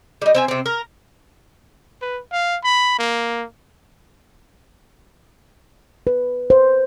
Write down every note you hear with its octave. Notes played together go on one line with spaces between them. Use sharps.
G3 D#4
C4 E5 G#5
C3 C4
A#4
B4
F5
B5
A#3
B4
C5